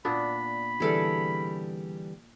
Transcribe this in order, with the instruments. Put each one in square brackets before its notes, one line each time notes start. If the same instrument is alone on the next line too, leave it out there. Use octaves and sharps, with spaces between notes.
[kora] A#2 B3 D4 [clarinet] B5
[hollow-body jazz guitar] D3 E3 G3 [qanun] G#4 A4